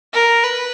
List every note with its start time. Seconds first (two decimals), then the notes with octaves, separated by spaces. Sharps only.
0.14 A#4
0.44 B4